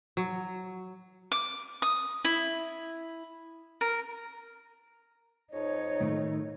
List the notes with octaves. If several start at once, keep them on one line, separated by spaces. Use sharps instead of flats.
F#3
D6
D#6
E4
A#4
F2 D#4 C#5
A2 D#3 A3